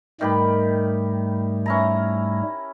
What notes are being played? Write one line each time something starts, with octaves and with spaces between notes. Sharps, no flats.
G#2 D#3 G3 A3 G4 B5
C#4 E4 A#5